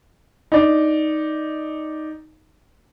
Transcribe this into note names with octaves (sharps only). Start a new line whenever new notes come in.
D#4 D5